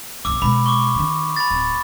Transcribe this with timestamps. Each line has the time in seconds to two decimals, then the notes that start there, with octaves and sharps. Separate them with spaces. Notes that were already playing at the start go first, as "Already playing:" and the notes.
0.25 B1 G2 D6 E6
0.42 B2 G#3 B5 F7
0.66 C#6 D6
0.95 D#3 D4
1.36 B5 A6
1.50 D1